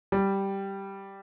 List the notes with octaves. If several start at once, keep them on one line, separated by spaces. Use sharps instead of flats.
G3